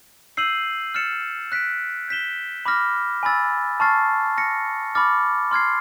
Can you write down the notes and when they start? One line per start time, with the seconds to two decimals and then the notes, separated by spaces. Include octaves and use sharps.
0.37 E6 G6 C7 D#7 F#7
0.95 F6 A6 C#7 E7
1.52 F#6 B6 D7
2.08 G6 B6 E7 G7
2.65 B5 D6 F6 A#6
3.23 G#5 B5 E6 A6
3.80 A5 C#6 F6 A6 C7
4.37 F6 A#6 C#7
4.95 B5 D6 F6 A6
5.51 C6 F6 G#6 C7